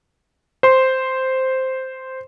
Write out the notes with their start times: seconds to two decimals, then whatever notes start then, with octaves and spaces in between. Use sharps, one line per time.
0.63 C5 C6